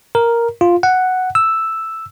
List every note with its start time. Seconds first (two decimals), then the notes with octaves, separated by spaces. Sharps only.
0.15 A#4
0.61 F4
0.83 F#5
1.35 E6